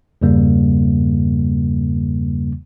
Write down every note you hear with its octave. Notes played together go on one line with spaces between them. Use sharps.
E2 G2 C#3 G3 A#3